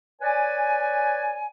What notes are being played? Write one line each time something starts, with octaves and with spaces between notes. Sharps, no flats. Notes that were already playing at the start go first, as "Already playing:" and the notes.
B4 C#5 D5 G#5